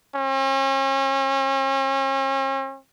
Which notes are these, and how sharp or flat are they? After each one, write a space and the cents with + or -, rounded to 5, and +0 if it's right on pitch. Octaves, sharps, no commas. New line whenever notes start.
C#4 -40